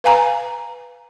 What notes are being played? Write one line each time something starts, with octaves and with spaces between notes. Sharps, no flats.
B4 F5 G#5 A#5